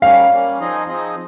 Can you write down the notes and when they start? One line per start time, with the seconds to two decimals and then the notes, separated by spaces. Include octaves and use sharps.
0.02 G3 A#3 C#4 F5
0.30 G3 A#3 C#4
0.59 F3 C4 D#4 G#4 D#5
0.87 F3 C4 D#4 G#4 D#5